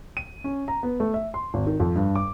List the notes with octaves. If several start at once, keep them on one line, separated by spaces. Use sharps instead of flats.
D#7
C#4
A#5
B3
A3
E5
C6
G#1
D#3
F2
G2
D6